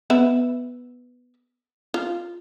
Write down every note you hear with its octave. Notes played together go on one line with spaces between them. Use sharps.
B3 B4 E5
F4